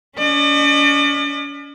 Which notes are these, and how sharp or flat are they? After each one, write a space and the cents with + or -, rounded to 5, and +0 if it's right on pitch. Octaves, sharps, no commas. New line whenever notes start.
C#4 +40 D5 +45